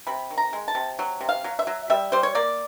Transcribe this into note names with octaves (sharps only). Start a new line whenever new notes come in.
C3 B5
D#3
A#5
G#3
A5
C3
F#3
C3
F5
F#3
E5
F#3
G3 E5
G3 C5
C#5
A#3 D5